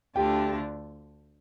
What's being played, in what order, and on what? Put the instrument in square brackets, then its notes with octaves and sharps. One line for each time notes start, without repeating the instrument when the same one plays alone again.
[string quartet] D2 D3 A3 D4 F4 [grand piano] G4 G5